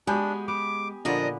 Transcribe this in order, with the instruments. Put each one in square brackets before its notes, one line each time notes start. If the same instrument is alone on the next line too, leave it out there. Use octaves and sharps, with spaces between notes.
[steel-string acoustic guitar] G#3 [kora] B3 F#4 [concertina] D4 [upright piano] G4 G#5 G6
[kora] B3 [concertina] D6
[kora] A#2 D3 B3 [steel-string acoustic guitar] F3 D4 A#4 [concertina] D#5